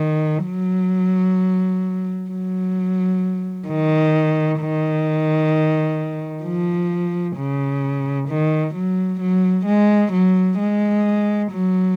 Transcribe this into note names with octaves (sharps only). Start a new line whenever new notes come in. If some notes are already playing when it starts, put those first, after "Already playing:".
Already playing: D#3
F#3
F#3
D#3
D#3
F3
C#3
D#3
F#3
F#3
G#3
F#3
G#3
F#3